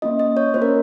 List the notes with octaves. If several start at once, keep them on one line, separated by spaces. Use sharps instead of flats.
A#3 C#4 F4 D#5
D#5
C#5
A#3 C#4 F4 C5
A#4